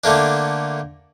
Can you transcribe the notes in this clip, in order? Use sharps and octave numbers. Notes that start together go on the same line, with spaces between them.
D3 A3 A#3 D4